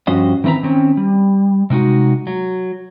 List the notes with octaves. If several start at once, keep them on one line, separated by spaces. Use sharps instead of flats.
G2 F3 C#4 F#4 C5 D#5
D#3 E3 C4 B4 A#5
D#3 C4 C#4
G3
C3 G#3 D#4 F#4
F#3